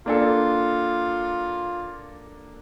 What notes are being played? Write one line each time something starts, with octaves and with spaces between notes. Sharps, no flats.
A#3 D4 F4 A4